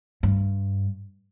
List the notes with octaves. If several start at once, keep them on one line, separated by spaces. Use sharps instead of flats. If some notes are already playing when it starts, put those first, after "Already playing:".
G2